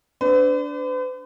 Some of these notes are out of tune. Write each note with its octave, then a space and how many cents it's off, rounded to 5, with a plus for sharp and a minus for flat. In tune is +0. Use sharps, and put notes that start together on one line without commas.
D4 -15 B4 +45